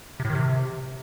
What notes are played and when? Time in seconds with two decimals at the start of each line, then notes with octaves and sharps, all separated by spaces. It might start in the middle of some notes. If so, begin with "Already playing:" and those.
0.20 C3
0.25 A2
0.30 D#3
0.35 C3